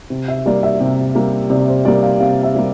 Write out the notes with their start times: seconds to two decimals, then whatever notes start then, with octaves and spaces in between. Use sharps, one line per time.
0.10 C3
0.28 E5
0.46 G3 A#3 D5
0.63 E5
0.80 C3
1.15 G3 A#3
1.50 C3 D5
1.68 C5
1.85 G3 A#3 D5
2.03 F5
2.20 C3 F5
2.43 E5
2.55 G3 A#3